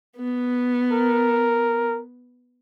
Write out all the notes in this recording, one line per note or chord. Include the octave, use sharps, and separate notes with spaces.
B3
A#4